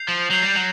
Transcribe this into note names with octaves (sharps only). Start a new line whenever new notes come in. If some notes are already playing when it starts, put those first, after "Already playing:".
Already playing: G6 C7 F7
F3
F#3 G6 C7 F7
G3
F#3